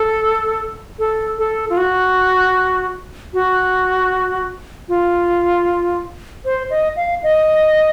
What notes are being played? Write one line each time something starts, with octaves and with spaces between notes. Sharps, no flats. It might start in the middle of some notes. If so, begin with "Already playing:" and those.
Already playing: A4
A4
A4
F4
F#4
F#4
F4
C5
D#5
F5
D#5